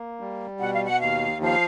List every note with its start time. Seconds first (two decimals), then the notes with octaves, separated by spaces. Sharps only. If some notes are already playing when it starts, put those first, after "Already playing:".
Already playing: A#3
0.20 G3
0.60 B2 F#5
0.73 F5
0.85 F#5
1.00 D#2 F5
1.41 F3 F5